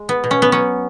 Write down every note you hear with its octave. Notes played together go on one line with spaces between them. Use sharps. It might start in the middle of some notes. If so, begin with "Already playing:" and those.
Already playing: G#3
B3
B2
C#4
B3
F#3 C#4